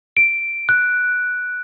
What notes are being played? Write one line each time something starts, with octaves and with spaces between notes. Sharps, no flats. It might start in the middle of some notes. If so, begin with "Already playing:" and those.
D7
F#6